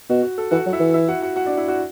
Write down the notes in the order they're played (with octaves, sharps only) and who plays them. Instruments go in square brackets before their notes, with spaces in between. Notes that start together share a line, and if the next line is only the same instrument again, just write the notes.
[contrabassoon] B2 [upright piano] F#4
[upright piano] F#4
A4
[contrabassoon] E3 [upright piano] F#4 F#5
[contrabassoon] F#3
[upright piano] E4 E5
[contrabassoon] E3
[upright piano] E4 E5
F#4 F#5
F#4 F#5
F#4 F#5
D4 D5
E4 E5
F#4 F#5